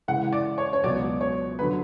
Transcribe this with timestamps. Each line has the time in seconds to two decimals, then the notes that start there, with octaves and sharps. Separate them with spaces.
0.08 C#3 E3 G#3 F#5
0.33 D5
0.58 C#5
0.73 C#5
0.83 C#2 B2 F#3 D5
1.21 C#5
1.59 B4
1.61 D3 F#3